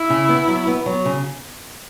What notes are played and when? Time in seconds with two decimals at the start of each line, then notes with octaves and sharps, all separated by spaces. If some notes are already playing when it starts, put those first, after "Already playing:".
Already playing: E4
0.10 C#3
0.29 B3
0.48 F#3
0.67 B3
0.86 F#3
1.05 C#3